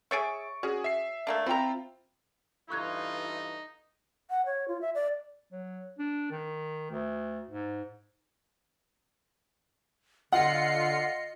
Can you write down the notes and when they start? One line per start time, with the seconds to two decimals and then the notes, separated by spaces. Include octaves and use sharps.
0.11 G#4 C#5 E5 C#6 A6 D7
0.63 C#4 F#4 G#4
0.84 E5 C7
1.27 A3 A#3 D4
1.46 C4 E4 F4 G5 A#5
2.70 G2 E3 D#4 F4 A4 C#6 F#6 G#6
4.30 F#5
4.46 C#5
4.68 F4
4.81 E5
4.95 D5
5.52 F#3
5.99 D4
6.31 D#3
6.91 D2
7.50 G#2
10.32 D3 F4 D#5 F#5 C7 C#7